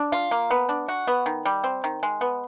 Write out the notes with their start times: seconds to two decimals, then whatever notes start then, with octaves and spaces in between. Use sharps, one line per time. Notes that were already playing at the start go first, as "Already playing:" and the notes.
Already playing: D4
0.12 F4
0.31 A#3
0.51 B3
0.69 D4
0.88 F#4
1.07 B3
1.26 D#3
1.45 G3
1.64 C4
1.84 D#3
2.03 G#3
2.21 B3